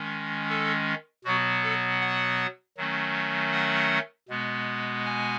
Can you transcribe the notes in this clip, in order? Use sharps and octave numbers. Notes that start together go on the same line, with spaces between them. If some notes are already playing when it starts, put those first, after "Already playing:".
Already playing: D#3 G#3 C#4
A4
B2 F#3 B3 F#4
A4
F#5
D#3 F#3 A3 C#4
F#5
B2 G#3 B3
G#5